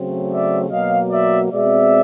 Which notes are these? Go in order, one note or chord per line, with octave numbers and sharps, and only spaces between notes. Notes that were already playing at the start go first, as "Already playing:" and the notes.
Already playing: C#3 F#3 A3 C4
D5 E5
B2 F#3 A#3 D#5 F5
D5 E5
B2 G#3 C4 D5 E5